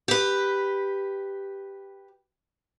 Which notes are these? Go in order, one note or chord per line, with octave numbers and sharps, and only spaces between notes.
G4 B4